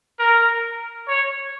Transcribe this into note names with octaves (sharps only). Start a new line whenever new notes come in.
A#4
C#5